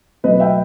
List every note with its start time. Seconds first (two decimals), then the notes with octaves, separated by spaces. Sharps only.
0.23 B2 F#3 A3 B4 D#5
0.40 E5 G5